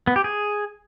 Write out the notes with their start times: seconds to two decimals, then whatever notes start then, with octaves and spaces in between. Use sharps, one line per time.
0.07 B3
0.16 G4
0.24 G#4